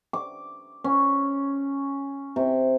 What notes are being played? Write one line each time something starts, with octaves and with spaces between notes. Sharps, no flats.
D6
C#4
C3